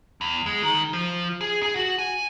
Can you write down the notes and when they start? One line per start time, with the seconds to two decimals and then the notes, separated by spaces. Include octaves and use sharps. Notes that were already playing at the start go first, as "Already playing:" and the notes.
0.21 E2
0.46 G#3
0.63 D#3
0.93 F3
1.41 G#4
1.63 G#4
1.76 F#4
1.99 G#5